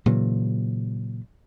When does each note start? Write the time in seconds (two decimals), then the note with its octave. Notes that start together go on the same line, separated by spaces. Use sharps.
0.06 A#2 C#3 E3 F#3